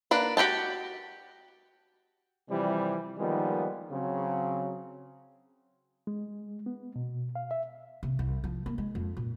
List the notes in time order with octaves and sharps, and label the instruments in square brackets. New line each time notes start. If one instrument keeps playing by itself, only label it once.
[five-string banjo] A#3 D4 B4
F#4 G4 G5 A5
[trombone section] C3 E3 F3 G3
D#3 F3 G3 G#3 A#3 B3
C#3 F#3 C4
[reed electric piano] G#3
B3
B2
F5
E5
[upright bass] C3
C2
F3
A#3
G#3
F2
A#2